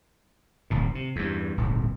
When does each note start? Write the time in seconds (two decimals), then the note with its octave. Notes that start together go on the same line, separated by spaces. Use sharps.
0.70 D1 G#1 A#2
0.95 C3
1.16 E2 G2
1.57 D#1 G#1 D2